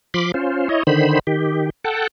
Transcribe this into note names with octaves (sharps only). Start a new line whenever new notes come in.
F3 B5 C6 D6
C#4 F4 C5
E4 C#5 D#5
D3 D#3 C5 B5
D#3 G4
A4 F#5 G5 A5